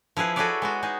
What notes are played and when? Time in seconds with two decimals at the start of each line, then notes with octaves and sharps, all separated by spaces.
0.17 F3 E4 G#4 B4
0.36 F#4 G#4 A4 B4 C#5 D5
0.62 G#3 B3 F#4
0.82 G#3 D#4 G#4